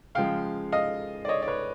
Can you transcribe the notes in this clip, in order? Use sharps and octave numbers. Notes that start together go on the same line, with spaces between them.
C#3 F3 G#3 F5 G5
D#5 F5
D5
C#5 D#5
D5
B4 C#5